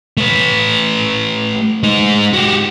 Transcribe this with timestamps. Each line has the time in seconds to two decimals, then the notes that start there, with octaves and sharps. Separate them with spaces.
0.17 A3 B4
1.83 G#3 D#4
2.33 F#4 G4